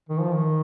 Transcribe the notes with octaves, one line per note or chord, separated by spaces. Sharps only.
D#3
F3
D#3